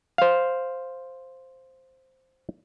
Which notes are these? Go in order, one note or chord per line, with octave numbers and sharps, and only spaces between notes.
C5 F5